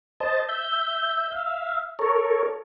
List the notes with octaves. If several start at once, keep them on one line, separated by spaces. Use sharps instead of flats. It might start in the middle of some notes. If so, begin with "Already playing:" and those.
C5 D#5 A5
E5 G6
E5 F5
A4 A#4 C#5